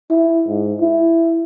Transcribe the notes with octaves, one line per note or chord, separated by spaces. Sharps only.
E4
G#2
E4